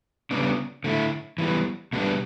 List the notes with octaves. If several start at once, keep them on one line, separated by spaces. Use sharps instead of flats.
C#3 G3 B3 D4
D3 A3 E4
E3 G3 B3
B2 G3 B3 D4